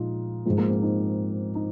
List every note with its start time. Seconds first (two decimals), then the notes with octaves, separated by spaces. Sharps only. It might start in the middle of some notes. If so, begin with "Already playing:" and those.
Already playing: A#2 F3 G#3 D#4 F4
0.46 G#2 F3 G#3
0.58 A#3
0.70 C4
0.83 D#4
1.55 D#4